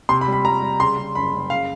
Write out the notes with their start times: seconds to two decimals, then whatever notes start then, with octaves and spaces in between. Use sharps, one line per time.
0.09 C3 C6
0.21 B5
0.27 G3
0.32 B5
0.44 G3 A#5
0.62 G3
0.80 C#3 C6
0.98 C#3
1.15 F#1 B5
1.34 F#1
1.50 C#3 F5